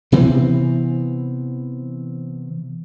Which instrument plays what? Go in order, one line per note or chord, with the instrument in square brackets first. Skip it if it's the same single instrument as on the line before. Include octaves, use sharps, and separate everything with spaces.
[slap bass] C3 E3 B3 C4